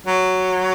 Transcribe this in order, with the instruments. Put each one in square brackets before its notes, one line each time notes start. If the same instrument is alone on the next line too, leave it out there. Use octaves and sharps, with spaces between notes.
[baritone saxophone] F#3